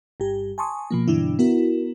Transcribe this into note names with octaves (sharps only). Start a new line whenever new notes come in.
G1 G2 G4
G#5 A5 C6 C#6 D#6
B2 F3 A#3
G2 B2 D3 E3 D4 E4
B3 E4 F#4 A#4